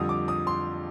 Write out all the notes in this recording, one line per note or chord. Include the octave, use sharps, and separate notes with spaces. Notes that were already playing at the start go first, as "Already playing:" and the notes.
Already playing: F2 D3 G3 D#6
D6
D#6
C6